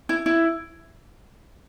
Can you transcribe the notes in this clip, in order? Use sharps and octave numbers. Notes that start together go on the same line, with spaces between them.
E4
E4